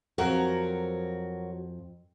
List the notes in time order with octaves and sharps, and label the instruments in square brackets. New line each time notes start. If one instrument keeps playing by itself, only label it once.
[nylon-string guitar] F2 [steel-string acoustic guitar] F#3 F#4 A#4